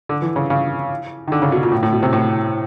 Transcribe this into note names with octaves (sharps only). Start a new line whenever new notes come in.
D3
E3
C#3
C#3
D#3
D3
C#3
B2
A#2
A2
A2
B2
C3
A2